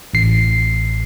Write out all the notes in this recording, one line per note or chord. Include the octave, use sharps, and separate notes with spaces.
A1 C7